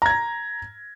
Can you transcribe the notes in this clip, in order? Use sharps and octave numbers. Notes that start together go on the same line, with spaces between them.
A#5 G#6 A#6